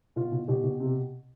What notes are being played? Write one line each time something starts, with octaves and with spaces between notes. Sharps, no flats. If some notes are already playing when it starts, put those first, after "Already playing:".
B2 F4
B2
B2 G4
B2
C3
G4